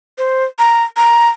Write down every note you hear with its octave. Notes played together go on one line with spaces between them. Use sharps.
C5
A#5
A#5